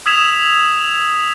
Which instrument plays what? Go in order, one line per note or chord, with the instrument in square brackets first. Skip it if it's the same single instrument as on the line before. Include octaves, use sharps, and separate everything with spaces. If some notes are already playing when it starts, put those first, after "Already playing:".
[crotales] D#6 E6 G#6 B6 E7 F7